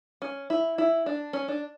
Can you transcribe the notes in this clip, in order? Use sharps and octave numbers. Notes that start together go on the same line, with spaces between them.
C#4
E4
E4
D4
C#4
D4